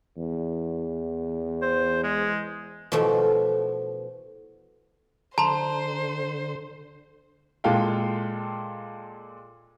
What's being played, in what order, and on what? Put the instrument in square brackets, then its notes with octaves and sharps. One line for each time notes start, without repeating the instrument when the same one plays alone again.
[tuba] E2
[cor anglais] C5
G#3
[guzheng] B2 E3 F3 A3
[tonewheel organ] D3 [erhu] C5 [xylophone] A5 C6 [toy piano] A#5
[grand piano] A#2 G#3 A4 F5 G5